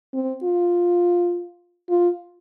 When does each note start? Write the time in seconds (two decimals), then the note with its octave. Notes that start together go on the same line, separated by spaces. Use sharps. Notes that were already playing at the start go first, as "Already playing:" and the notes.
0.14 C4
0.44 F4
1.90 F4